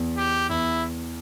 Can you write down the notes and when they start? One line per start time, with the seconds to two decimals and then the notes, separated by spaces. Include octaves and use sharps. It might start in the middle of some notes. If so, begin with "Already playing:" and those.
Already playing: E2
0.17 G4
0.49 E2 E4